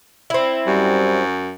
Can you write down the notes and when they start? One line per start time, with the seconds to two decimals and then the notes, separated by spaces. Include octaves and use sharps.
0.30 C4 E4
0.67 F#2 G3